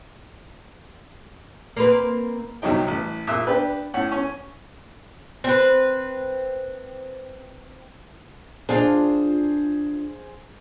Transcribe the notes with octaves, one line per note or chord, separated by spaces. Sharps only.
A#3 C4 B4
C2 C3 F#3 D#4 G5
A1
A#2 E5 D#6 E6 F#6
D4 G4 B4
A2 C#4 F#5
C#4
C4 B4
D4 F4 G#4 C5